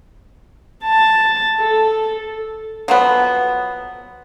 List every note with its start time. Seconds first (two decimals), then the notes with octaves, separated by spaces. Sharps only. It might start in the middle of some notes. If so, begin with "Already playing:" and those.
0.84 A5
1.59 A4
2.88 F3 F#3 B3